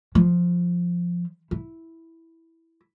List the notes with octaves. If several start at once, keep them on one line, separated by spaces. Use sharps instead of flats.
F3
E4